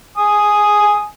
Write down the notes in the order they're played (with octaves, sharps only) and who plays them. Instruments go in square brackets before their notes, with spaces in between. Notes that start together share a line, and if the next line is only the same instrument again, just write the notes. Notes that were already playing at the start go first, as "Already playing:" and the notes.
[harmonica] G#5 D#6